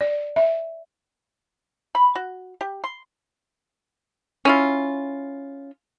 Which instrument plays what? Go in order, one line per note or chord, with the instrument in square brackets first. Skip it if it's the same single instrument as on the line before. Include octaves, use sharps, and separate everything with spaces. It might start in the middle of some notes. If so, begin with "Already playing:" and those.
[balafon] D5
E5
[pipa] B5
F#4
G4
C6
C#4 E4 F4